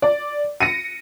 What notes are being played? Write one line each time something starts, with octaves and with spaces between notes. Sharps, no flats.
D5
A#6 C#7 D#7